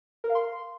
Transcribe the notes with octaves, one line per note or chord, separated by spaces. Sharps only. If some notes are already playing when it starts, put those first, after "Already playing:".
A#4
F5
C6